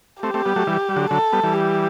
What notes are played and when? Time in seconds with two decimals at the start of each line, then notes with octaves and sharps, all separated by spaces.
0.23 A3 C4 G4
0.34 A3 C4
0.45 G3 B3
0.56 F#3 A3
0.67 E3 G3
0.89 G3
0.96 D3 F#3
1.11 D3 F#3 A4
1.32 G3 B3
1.43 E3 G3
1.54 G4